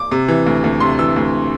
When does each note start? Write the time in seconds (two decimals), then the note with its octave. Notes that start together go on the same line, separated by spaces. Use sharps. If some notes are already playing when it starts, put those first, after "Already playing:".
Already playing: D6
0.12 C3
0.28 E3
0.46 D2
0.64 D2
0.80 C3 C6
0.99 E3 E6
1.16 D2